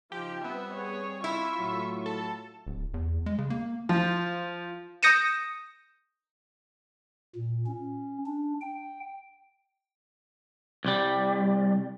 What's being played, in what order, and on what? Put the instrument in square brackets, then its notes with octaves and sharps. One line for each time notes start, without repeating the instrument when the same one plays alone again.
[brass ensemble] C#3 D#4 G5 [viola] F3 [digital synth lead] G4
[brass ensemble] G3 C4 [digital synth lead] B3 [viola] E5
[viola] G#4 C#5
[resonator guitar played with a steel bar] E4 [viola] F4 C#6 [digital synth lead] E5
[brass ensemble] A2 F#3
[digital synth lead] A4
[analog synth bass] D1
E2
G#3
C#3
A#3
[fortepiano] F3
[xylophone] D#6 G6 A#6 C#7 D#7 E7
[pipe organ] A#2
C#4
D4
G5
[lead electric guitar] C2 G3